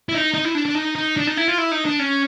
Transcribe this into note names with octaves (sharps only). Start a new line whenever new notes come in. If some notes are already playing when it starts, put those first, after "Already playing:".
E4
D#4
D#4
E4
D4
D4
D#4
D#4
D4
D#4
E4
F4
E4
D#4
D4
C#4